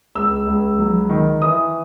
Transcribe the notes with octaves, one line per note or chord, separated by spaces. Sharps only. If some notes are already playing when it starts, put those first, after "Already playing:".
C#2 E6
C#2
F#3
D#3
E3 D#6